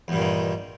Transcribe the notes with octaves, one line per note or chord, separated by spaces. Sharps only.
E2 G2 A#2 D#3